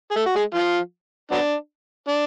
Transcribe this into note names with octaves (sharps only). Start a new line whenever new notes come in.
G#4
A3 A4
F#4
G#3 G#4
F3 F4
F#3 B3 D4
D4